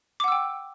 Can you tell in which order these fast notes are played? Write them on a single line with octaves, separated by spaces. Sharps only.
D6 F#5 E6 G5